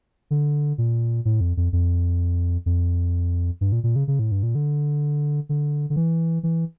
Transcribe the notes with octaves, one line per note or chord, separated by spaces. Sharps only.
D3
A#2
A2
F2
F2
F2
F2
G2
A#2
A#2
C#3
C#3
A2
G2
A#2
D3
D3
D3
E3
E3